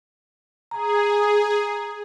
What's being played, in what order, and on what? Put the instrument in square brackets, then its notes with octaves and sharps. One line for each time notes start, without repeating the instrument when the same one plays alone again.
[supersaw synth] G#4 [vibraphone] A#5